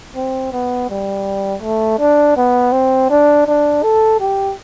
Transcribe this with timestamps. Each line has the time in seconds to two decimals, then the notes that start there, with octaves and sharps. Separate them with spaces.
0.15 C4
0.52 B3
0.90 G3
1.62 A3
1.99 D4
2.36 B3
2.72 C4
3.10 D4
3.47 D4
3.83 A4
4.20 G4